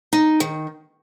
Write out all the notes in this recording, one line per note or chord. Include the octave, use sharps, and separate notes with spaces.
D#4
D#3